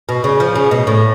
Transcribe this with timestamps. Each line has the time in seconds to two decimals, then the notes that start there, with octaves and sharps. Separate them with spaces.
0.09 B2
0.24 C#3
0.40 F3
0.55 C#3
0.71 B2
0.87 A2